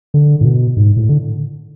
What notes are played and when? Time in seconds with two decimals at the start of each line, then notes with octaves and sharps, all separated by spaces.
0.14 D3
0.41 A2
0.45 B2
0.77 G#2
0.97 A2
1.09 D3